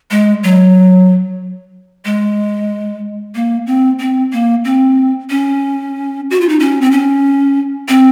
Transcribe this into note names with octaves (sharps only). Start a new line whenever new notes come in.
G#3
F#3
G#3
A#3
C4
C4
A#3
C4
C#4
F#4
F4
D#4
C#4
C4
C#4
C4